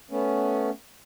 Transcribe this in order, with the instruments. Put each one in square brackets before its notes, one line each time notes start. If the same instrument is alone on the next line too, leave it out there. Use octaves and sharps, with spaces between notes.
[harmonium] A3 B3 C#4